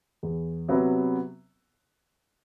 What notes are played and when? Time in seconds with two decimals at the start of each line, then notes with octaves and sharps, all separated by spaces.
0.23 E2
0.69 C3 F#3 B3 F#4